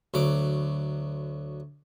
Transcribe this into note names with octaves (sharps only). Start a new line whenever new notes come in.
D2 F#3 D6